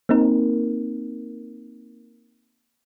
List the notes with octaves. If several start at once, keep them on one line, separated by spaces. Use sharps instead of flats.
A#3 C4 D#4 A#4